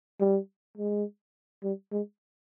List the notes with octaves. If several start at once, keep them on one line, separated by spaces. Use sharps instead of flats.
G3
G#3
G3
G#3